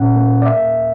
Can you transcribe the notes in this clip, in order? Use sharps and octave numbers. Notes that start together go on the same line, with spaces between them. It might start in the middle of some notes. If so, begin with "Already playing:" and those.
Already playing: A#2 C#4 F#5
A#3
D5
A#3 E5